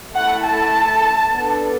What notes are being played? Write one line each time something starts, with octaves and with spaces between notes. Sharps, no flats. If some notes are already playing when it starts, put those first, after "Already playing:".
A3 E4 A4 F#5
A5
B3 D4 A4